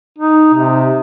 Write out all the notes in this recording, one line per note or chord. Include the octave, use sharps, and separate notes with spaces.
D#4
C3